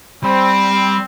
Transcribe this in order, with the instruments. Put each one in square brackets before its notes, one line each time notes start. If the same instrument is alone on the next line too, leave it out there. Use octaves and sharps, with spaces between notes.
[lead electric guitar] G3 [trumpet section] C4 [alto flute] B5